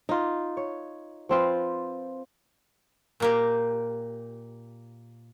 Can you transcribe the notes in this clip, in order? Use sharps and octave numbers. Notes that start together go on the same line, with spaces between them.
D#4 F4
C#5
F3 C4 F4 B4
A#2 A#3 G4